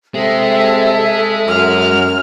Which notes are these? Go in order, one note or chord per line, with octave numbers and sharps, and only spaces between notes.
C3 G#3 A4 E5
F#2 F6